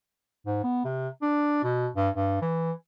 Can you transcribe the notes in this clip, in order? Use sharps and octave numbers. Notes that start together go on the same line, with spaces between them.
G#2
B3
C3
D4
B2
G2
G2
E3